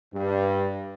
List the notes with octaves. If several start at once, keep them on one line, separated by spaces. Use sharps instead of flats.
G2